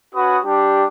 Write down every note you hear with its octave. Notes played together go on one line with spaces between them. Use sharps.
C#4 F#4 B4 D#6
G3 D4 G4